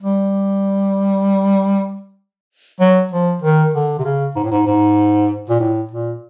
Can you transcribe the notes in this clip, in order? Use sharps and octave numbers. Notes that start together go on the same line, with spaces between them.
G3
F#3
F3
D#3
D3
C3
C#3
G#2
A2
G#2
G#2
A#2
A2
A#2